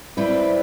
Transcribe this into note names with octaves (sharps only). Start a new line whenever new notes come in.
G3 C4 E4 B4